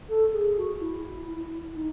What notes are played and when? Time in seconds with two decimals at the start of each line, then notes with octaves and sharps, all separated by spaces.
0.09 A4
0.33 G#4
0.57 F#4
0.80 E4
1.75 D#4